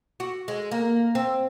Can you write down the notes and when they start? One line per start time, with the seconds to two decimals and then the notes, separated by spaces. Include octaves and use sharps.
0.20 F#4
0.48 G#3
0.71 A#3
1.15 C4